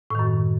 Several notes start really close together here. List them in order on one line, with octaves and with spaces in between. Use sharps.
A2 D#3 F#2